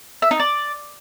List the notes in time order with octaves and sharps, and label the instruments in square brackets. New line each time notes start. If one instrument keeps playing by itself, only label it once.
[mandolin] E5
D#4
D5